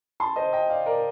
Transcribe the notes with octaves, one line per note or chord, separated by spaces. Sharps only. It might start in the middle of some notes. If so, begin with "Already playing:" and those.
A5 C6
C5 D#5
D#5 G5
D5 F5
A#4 D5